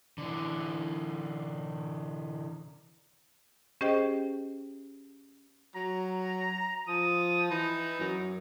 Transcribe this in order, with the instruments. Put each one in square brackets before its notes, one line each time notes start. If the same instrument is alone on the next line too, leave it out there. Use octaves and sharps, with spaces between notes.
[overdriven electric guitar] D3 E3
[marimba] C#4 G4 G#4 C5 D#5 G5
[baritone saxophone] F#3 [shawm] A#5
[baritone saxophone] F3 [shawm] D#6
[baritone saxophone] E3 [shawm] D#4
[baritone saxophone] F#2